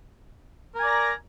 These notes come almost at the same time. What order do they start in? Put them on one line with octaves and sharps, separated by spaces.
A#4 G#5 D5 A#5